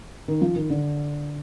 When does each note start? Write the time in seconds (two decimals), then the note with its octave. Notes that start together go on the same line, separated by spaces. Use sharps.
0.28 D#3
0.42 F3
0.56 D#3
0.70 D3